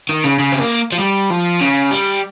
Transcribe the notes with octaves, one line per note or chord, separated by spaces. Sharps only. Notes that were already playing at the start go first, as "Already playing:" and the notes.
D#3
C#3
C#3
C4
A#3
F3
G3
F3
C#3
G3